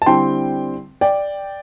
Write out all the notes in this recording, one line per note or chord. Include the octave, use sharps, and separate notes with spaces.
A5
D3 G3 C4 E4 G5 C6
D5 G5